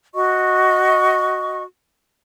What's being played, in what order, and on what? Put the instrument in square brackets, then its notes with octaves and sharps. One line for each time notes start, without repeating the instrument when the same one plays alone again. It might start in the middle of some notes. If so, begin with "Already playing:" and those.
[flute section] F#4 D#5 C#6